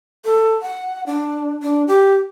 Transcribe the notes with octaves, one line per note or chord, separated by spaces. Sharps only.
A4
F#5
D4
D4
G4